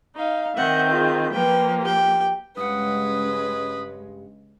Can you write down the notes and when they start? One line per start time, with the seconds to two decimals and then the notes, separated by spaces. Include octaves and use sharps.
0.17 D#4 F5
0.56 D#3 C4 E5 F#5 G6
0.90 F4 G#4
1.31 F3 A#3 B4 G5
1.81 G4 G5
2.57 G2 C#3 G#3 B4 F#5 D#6